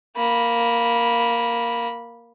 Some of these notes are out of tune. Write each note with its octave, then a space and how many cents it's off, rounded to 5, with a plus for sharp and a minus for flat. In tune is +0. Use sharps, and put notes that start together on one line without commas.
A#3 +0 B5 -15